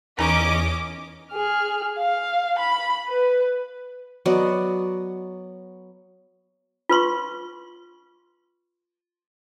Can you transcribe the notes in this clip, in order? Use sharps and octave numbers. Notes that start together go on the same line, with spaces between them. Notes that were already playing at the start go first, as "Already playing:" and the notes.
E2 E3 C#4 D#4 D#5 A#5 D6
G#4 F6
F5
B5
B4
F#3 B3 D5 D#5
F4 B4 C6 C#6